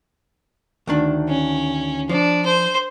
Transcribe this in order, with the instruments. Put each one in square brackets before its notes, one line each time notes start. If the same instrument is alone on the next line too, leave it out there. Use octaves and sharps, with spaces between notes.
[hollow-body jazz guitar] D2 D#3 D4
[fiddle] C#4
[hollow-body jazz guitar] F3 [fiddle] D4
[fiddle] C5